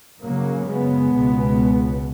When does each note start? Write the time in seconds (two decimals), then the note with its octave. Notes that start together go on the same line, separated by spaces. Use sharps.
0.23 F#2 C#3 F#3 A#3
0.68 G#3 B3
1.13 C#2 B2